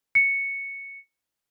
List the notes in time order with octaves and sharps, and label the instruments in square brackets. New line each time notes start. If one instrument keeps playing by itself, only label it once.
[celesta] C#7